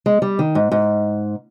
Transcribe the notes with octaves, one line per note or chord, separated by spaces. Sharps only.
G#3
G3
D#3
G#2
G#2